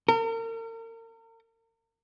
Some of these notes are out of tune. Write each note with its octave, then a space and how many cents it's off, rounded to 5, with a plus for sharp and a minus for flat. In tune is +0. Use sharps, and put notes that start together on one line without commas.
A#4 -40